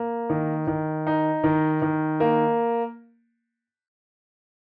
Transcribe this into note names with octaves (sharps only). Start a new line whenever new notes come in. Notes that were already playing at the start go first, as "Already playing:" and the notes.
Already playing: A#3
D#3
D#3
D#4
D#3
D#3
A#3